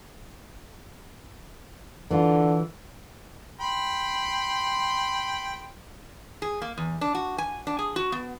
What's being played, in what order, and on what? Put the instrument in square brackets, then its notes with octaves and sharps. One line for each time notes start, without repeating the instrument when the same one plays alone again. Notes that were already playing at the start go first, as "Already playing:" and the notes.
[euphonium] D3 [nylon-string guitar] E3 F4
[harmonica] G5 B5 C6
[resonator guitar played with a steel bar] G#4
A#3
E2
D4
F#4
G#5
D4
G#4
F#4
B3